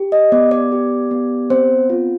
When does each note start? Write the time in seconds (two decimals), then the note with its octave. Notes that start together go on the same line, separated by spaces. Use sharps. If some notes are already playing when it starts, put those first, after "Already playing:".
Already playing: G4
0.12 D#5
0.32 B3 D5
0.51 D5
0.72 G4
1.11 B3
1.50 C4 C5
1.90 F4